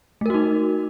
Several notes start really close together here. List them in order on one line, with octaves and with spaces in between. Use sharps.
A3 A#4 F#4 D#4